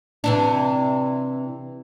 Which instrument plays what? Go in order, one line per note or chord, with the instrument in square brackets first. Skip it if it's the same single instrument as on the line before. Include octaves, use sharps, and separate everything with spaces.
[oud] C3 E3 D4